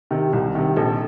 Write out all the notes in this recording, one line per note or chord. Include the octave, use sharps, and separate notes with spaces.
C3 D#3
C2
C3 D#3
A#1 A4